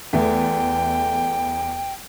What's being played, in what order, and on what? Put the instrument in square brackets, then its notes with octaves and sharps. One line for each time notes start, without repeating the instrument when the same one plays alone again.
[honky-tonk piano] E2 A3 [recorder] G5